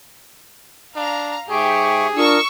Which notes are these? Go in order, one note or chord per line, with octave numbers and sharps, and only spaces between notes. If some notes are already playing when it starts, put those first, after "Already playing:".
D4 F5 A#5
G#2 G4 G#4 E5 G5 C#6
D4 F4 A#4 C#6 D#6 E6